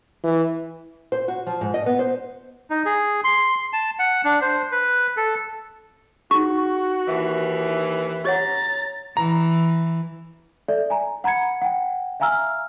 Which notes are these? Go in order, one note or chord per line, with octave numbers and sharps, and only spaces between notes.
E3
C5
F#4
F3
G#2
D#5
B3
C5
D#4
G#4
C6
A5
F#5
D4
C5
B4
A4
D#4 F#4 G#4 C#6
D#2 E3 E5
G4 C#5 F#5 A#5 A6
E3 A#5
A4 D5 E5
G#5 A#5
F#5 A#5 B5 G#6 C#7
F#5 G5
E5 F5 G#5 A#5 E6 F6